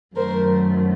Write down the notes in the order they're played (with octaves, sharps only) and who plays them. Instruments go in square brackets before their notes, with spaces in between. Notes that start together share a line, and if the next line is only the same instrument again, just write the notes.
[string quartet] F#2 D#3 F#3 A3 A#4 C5